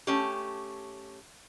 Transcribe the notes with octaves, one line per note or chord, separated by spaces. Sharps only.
A3 C#4 G4